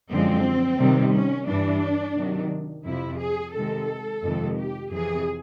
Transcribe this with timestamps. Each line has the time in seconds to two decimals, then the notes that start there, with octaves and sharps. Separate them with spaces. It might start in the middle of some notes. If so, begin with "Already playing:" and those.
0.10 F#2 D3 F3 G#3 C4
0.79 C3 D#3 G3
1.13 C#4
1.48 G2 E3 G3 D4
2.17 C3 D#3 F#3
2.85 F2 C3 F3 E4
3.20 G#4
3.54 C3 D#3 G#3 A4
4.23 F2 C3 D#3 G#3
4.57 G4
4.91 F2 C3 E3 G#4